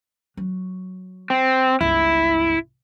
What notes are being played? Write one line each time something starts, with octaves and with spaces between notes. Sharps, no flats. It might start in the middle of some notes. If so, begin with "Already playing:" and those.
F#3
C4
G1 C#2 E4